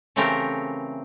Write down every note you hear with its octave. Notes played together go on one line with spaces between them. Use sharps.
C#3 E3 A3 C4 G4 A#4